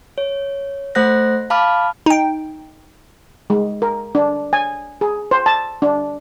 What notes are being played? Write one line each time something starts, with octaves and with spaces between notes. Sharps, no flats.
C#5
A3 C5 F#5 F#6 A#6
F5 A5 B5 D6 F6
D#4 G5
G#3
A#4
D4
G#5
G#4
C5
A5
D4